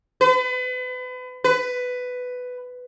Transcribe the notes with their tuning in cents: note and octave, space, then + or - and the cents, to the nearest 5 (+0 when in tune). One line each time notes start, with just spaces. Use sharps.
B4 +35
B4 +10